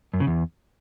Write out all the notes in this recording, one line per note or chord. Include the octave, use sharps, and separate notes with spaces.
F#2
C#3
E2